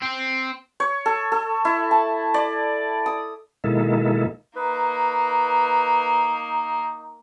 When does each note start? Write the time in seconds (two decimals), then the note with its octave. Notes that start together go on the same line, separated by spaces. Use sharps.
0.02 C4
0.80 C#5
1.06 A4
1.32 A4
1.65 E4
1.91 A5
2.34 D5
3.06 D#6
3.64 B2 D#3 G#3 A#3 E4 A4
4.56 A#3 D#4 B4